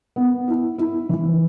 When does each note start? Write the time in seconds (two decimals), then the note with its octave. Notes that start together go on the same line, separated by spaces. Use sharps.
0.16 B3
0.48 E4
0.78 E4
1.09 E3